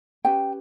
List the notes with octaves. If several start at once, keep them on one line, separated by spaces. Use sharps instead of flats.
C#4 G4 B4 G5